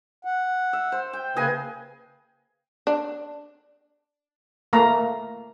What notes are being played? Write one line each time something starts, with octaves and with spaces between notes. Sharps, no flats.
F#5
E5
C5
G5
C#3 A#3 G#4 B4 D#5 G#5
D4
A3 A#3 A#5